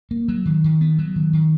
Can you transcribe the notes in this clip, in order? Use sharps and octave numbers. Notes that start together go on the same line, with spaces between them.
A#3
F#3
D#3
D#3
B3
F#3
D#3
D#3